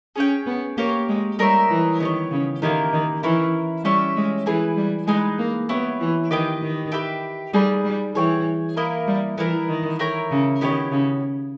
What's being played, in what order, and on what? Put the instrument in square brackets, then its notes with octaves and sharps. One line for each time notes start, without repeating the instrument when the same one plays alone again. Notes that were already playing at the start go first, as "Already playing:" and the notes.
[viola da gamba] C#4 [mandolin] G#4 C#5 G5
[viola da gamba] B3
[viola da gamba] A#3 [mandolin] G4 A#4 C#5
[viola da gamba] G#3
[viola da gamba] G3 [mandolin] D#4 A#4 C#5 E5
[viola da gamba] E3
[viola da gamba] D#3 [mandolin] B3 G4 C#5
[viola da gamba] C#3
[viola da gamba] D#3 [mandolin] A#3 E4 G4 A#4
[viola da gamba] D#3
[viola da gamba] E3 [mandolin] C#4 E4 A#4
[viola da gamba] G3 [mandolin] C#4 G4 C#5 E5
[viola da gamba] G#3
[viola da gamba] E3 [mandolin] E4 G#4 B4
[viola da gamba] G3
[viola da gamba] G#3 [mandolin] D#4 G#4 B4
[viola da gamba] A#3
[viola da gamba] B3 [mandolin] E4 G4 C#5
[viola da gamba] E3
[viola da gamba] D#3 [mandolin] G4 B4 D#5 G5
[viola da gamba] D#3
[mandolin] G4 B4 E5 G5
[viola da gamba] G3 [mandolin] D#4 G#4 B4
[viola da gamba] G3
[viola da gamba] E3 [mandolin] G#4 C#5 G5
[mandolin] A#3 E4 A#4 D#5
[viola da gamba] G3
[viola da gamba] E3 [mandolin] B3 E4 A#4
[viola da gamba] D#3
[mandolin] E4 A#4 C#5 G5
[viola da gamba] C#3
[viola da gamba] D#3 [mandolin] B3 E4 G4 C#5
[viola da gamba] C#3